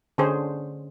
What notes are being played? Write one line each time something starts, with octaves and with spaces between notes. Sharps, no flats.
D3 C#4 G#4 C5